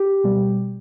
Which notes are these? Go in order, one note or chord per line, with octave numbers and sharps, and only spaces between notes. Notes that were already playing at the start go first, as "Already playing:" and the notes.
Already playing: G4
B2 G3